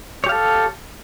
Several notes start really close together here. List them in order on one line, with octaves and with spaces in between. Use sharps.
C#5 G4 F5 A4